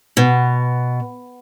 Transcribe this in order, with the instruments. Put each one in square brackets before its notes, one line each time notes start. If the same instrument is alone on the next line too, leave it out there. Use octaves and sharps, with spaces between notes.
[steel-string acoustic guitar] B2